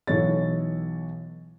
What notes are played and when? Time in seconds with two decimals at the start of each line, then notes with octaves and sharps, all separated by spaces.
0.07 B1 E3 A4 C#5 A6